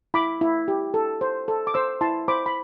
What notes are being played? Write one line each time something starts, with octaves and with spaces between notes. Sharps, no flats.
E4 B5 D6
E4
G4
A4
C5
A4
D6
C5 C6 E6
E4 A5 C6
C5 B5 D6
B5